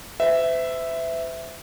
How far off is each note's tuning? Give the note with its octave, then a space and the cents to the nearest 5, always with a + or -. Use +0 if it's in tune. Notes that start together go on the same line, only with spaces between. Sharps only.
C5 -45 E5 +0